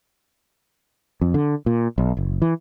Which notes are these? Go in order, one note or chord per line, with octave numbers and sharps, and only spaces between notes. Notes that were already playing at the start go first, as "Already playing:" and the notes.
F2
D3
A#2
B1
F#1
E3